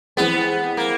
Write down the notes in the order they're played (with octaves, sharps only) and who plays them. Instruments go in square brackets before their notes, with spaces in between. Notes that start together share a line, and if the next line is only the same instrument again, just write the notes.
[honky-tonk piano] E3 G#3 C4 [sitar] B3
[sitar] A#3